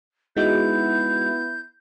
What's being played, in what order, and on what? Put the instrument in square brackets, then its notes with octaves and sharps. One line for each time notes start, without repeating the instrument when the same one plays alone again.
[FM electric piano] G#3 D#4 F#4 [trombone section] B3 E4 [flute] G6